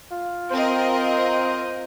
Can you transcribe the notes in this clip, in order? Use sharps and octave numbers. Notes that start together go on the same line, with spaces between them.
F4
C4 A#4 C5 D#5